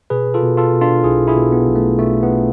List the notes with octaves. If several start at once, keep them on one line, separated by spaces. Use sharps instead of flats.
B2 G#4 B4
F4 A4
B2
F4 A4
B2
D4 F4
B1 E4 G#4
E4 G#4
B2
B3
B1
A3
B2 A3
B3